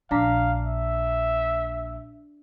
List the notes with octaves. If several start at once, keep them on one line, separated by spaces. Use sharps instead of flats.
A#1 D4 F5 A#5 B6
E5